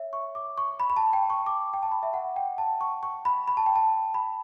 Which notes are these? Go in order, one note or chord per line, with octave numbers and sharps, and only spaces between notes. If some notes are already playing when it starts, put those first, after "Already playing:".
Already playing: C#5 E5
C#6
D6
C#6
B5
B5
A5
G5
C#6
D6
G5
A5
B5
E5
F#5
G5
A5
C#6
C#6
B5
B5
A5
G5
A5
B5